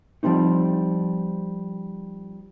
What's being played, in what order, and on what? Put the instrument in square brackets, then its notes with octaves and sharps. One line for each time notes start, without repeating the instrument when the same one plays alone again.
[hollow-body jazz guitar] F3 G3 G#3 C4 D#4